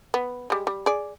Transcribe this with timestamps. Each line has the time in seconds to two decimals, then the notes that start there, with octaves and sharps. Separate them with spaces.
0.14 B3
0.50 G3 G#3
0.67 G3
0.86 G#4 D5